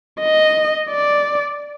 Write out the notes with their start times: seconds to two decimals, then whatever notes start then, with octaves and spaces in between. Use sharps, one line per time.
0.21 D#5
0.90 D5